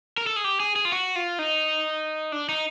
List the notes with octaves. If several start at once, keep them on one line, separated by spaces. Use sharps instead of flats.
A#4
A4
G#4
G4
G#4
G#4
F4
F#4
F4
D#4
D4
D#4